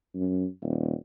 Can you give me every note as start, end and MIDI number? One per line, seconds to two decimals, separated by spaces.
0.14 0.46 42
0.62 0.93 27